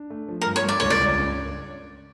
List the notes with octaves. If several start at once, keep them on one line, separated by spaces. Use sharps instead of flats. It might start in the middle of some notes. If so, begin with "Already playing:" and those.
Already playing: D4
A3
F3
A#4
G2
C#5
G2 D5
C#2 C#5
D5
C#2
C#4